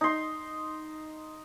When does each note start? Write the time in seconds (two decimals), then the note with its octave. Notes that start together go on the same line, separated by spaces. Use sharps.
0.01 D#4 C6